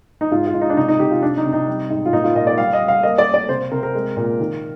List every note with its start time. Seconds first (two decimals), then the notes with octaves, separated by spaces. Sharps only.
0.21 D#4
0.31 G#2 F4
0.47 F4
0.54 G#2
0.61 D#4
0.70 D4
0.77 C3 D#4
0.88 D#4
0.99 C3 G4
1.11 F4
1.22 C3 D4
1.37 D#4
1.45 C3
1.53 D#4
1.68 G3
1.90 G#2
2.06 F4
2.13 A#2 D#4
2.24 F4
2.35 A#2 D#5
2.47 D5
2.58 G3 F5
2.73 D#5
2.81 G3
2.88 F5
3.03 A#3 D#5
3.18 D5
3.26 A#3
3.34 D5
3.49 C3 C5
3.71 C3 A#4
3.83 A#4
3.94 G#3
4.17 A#2
4.40 D#3